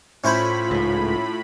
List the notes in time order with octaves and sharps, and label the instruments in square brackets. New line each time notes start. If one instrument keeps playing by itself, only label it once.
[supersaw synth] A2 B5 [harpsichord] C#4 E4 C5 [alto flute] F4
[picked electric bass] C#2 G#2